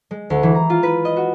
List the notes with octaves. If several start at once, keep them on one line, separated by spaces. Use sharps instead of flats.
G#3
D2
E3
A#5
F4
B4
D#5
F#4